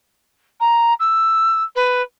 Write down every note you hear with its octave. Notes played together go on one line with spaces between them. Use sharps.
A#5
E6
B4